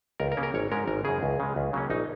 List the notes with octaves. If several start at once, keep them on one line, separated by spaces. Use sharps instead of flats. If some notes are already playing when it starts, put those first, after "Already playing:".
C#2 A#4
A#4
C#3 A#3 C#4
A#4
G#1 C#5
G#2 G#3 C#4 A#4
G#1 A#4
F#2 C#3 G#4
C#2
C#3 G#3
C#2
C#3 F#3 A#3 C#4
A#1 D#4